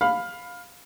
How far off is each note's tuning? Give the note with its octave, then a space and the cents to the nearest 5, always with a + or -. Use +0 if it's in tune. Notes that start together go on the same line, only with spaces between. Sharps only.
F5 +15 B5 +10